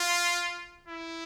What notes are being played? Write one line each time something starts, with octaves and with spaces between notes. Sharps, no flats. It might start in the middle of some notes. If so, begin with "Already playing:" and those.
Already playing: F4
E4